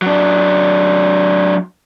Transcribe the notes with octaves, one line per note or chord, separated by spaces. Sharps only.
F#3 D4